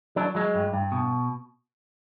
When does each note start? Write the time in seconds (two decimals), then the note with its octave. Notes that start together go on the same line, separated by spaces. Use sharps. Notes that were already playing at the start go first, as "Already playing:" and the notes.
0.16 F#3 D4
0.35 F#3 G#3
0.54 G2
0.74 G2
0.92 B2